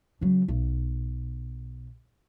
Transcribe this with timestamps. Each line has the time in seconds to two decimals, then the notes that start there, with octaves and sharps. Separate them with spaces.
0.21 C#3 F#3
0.48 B1